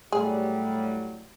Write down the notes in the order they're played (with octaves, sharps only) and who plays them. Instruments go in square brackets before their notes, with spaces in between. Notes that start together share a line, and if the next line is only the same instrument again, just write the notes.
[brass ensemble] A2 F#3 G3 [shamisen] G#4